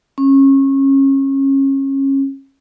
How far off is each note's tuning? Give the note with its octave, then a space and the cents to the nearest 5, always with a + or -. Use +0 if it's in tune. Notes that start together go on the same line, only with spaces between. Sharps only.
C#4 -25